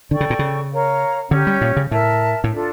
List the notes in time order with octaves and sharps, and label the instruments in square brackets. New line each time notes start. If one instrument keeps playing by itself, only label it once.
[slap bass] D3 [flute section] A4 D5 G5 C#6
[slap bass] C#3
A#2
C#3
[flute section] A#4 C#5 F5 A#5
[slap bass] D3 [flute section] C#4 G4 C#5
[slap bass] G3
A#2
C#3
[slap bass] A2 [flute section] A#4 E5 A5
[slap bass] A2
[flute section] D4 F4 A4